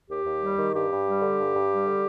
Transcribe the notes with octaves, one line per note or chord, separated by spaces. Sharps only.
D#2 G4
D#2
G3
D#3
G2 G4
G2
G3
D3
G2
G2
G3
D3